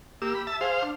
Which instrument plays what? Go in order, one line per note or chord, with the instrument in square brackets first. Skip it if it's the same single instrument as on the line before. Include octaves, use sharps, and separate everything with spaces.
[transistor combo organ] A#3 E6 [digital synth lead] G4
[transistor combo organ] B5
[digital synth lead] E5 [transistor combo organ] A5 E6
[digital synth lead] G#4 [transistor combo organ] C5 F5
[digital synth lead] D4